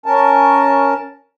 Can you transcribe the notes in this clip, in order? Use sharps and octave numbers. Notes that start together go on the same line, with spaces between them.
C#4 A#4 A5